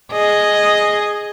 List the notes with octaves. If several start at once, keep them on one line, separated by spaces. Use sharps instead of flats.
G#4 D#5